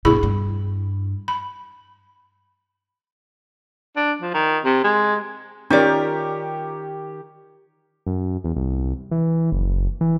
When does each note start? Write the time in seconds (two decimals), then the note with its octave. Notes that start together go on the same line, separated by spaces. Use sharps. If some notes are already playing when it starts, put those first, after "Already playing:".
0.05 G1 B2 E4 G#4 B5
0.23 G2
1.28 B5
3.97 D4
4.22 F3
4.34 D#3
4.64 C3
4.84 G#3
5.70 D#3 C#4 D#4 F4 G4 A#4 D5 G5
8.07 F#2
8.44 E2
8.56 C2
9.11 E3
9.52 F#1
10.01 E3